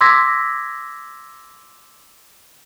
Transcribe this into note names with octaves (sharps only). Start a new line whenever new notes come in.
C6 D6 E6 G#6 A#6 B6